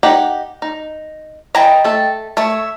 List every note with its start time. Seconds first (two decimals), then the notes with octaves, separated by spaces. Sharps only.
0.03 D#4 G4 F#5
0.62 D#4
1.55 E3 D#5 G5 A5 A#5
1.84 A3 A4
2.37 A3 C#5 E5